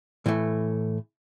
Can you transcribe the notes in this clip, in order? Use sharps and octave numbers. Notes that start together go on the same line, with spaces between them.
A2 E3 A3